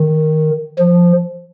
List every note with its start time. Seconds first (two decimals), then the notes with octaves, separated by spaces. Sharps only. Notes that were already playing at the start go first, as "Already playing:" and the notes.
Already playing: D#3
0.79 F3